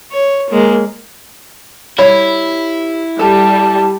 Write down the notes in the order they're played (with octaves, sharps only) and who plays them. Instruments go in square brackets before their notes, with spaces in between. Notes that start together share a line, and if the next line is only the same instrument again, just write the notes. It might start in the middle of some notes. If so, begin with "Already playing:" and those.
[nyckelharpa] C#5
G#3 A#3
[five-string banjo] G3 C#5 B5 [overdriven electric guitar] E4
[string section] G3 [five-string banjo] A4 [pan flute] A5